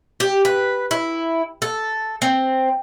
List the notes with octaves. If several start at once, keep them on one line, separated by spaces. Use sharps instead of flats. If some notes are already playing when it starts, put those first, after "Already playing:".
G4
B4
E4
A4
C4